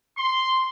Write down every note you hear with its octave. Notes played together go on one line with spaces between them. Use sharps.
C6